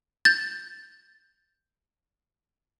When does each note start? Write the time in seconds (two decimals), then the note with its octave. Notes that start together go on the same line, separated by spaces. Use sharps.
0.25 G6 A6